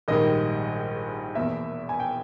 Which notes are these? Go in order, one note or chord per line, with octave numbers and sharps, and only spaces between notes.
A#1 G#2 D#3 G3 D#5
E2 B2 A#3 E5
G#5
G5